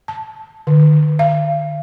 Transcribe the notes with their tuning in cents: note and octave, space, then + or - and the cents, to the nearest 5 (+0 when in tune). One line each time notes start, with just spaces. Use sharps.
A5 -5
D#3 -45
F5 -35